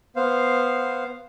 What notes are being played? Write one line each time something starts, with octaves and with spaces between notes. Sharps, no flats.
B3 C5 F5